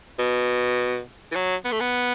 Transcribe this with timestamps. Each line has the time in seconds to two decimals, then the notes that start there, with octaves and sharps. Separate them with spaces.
0.19 B2
1.32 E3
1.35 F#3
1.65 B3
1.72 A3
1.80 B3